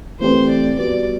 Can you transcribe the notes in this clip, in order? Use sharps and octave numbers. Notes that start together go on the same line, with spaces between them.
E3 A3 C4 G4 B4 C5
D5
G3 B3 F#4 D5